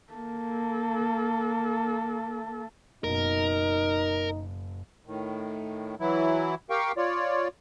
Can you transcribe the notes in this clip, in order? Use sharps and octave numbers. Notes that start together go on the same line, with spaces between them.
A#3 A4
F#1 B2 D#4 A#4
A2 D#3
E3 F#3 E4
G4 A#4 F5 G5 C#6
F4 C#5 D5